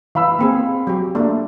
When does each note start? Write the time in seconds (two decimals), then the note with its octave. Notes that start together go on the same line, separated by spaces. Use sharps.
0.15 E3 F5 B5 E6
0.39 A#3 C4 G#4
0.87 F#3 G4
1.15 A3 A#3 D4